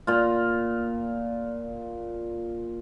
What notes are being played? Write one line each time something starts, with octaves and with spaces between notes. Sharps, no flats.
A#2 F4